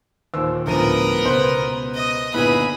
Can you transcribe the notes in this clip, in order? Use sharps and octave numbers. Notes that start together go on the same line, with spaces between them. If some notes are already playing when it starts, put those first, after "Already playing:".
D#2 A#2 C5 E6
D2 A2 F3 B3 A#4 D#7
C#2 B2 B4 C5
D#5
G1 A#2 B3 D#4 E4 G#4 B4 B5